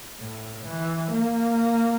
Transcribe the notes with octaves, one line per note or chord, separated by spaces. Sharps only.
A2
E3
A#3